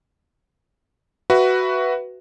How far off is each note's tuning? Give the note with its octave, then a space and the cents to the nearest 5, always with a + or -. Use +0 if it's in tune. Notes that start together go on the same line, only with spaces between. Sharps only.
F#4 +10 B4 +0 E5 +15